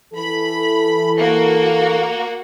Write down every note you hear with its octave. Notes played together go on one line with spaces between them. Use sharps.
E3 A4 B5
A#3 F#4